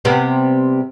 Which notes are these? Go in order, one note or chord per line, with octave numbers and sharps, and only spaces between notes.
C3 G3 B3